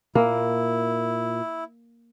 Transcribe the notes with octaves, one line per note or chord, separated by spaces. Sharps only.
A#2 A#3 E4